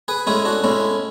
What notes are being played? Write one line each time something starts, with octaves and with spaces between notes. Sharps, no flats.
G#4 B4
A2 G#3 C#4 E4 G#4
D4 F#4
A2 G#3 C#4 E4